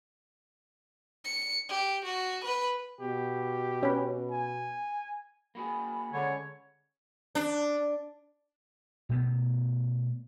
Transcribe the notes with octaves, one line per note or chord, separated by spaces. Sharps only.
C#7
G4
F#4
B4
B2 G4
C#4 B4
G#5
A#3 F#4 G#4 B5
D3 G#3 C#4 C#5
D4
B2 A3 B3